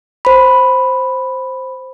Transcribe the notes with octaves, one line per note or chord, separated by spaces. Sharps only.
C5 B5